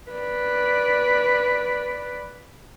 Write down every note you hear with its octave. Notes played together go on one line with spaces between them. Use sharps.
B4 D5